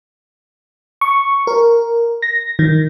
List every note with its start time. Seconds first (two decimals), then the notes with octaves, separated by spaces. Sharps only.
1.01 C#6
1.47 A#4
2.22 A#6
2.59 D#3